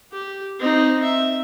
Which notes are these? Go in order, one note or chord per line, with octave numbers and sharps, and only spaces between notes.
G4
C4 D#4
E5